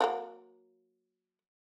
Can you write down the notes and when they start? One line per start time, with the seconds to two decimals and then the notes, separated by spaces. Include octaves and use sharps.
0.01 F3 F#3 A#3